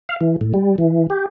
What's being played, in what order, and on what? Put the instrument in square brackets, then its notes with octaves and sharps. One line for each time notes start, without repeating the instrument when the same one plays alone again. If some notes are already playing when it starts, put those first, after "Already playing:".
[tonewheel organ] F5
E3
A2
G3
E3
G4